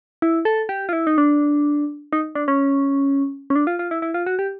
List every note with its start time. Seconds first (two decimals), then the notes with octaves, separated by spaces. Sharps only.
0.22 E4
0.45 A4
0.69 G4
0.89 F4
0.93 E4
1.07 D#4
1.18 D4
2.13 D#4
2.35 D4
2.48 C#4
3.50 C#4
3.55 D4
3.67 F4
3.79 F4
3.91 E4
4.02 E4
4.14 F4
4.26 F#4
4.39 G4